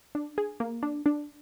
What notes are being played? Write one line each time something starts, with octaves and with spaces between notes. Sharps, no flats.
D4
G#4
A#3
D4
D4